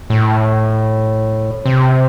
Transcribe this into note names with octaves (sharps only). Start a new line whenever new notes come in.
A2
C3